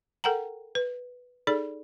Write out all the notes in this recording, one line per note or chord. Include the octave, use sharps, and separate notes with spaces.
A4 A#4 F#5 G5 A#5
B4
D#4 G#4 A4 D5